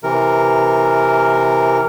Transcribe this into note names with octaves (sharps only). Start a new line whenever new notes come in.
C3 E3 A#4